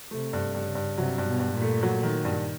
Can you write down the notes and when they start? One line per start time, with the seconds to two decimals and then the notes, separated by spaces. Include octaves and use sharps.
0.11 C3 A3
0.33 G2
0.54 G2 C#3
0.75 G2
0.97 C3 F#3
1.18 G2
1.26 B2
1.39 G2
1.53 A#2
1.62 A3
1.83 F#3
2.03 D#3
2.25 G2